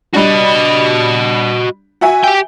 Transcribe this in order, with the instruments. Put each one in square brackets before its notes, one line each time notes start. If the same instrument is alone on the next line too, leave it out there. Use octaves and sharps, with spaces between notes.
[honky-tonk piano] G3 D4 [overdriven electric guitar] F#4 D#5
[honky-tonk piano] F#4 E5 G#5
[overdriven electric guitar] G4 G5